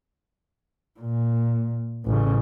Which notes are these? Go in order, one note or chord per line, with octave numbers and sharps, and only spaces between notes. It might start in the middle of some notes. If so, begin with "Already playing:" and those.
A#2
A1 C#3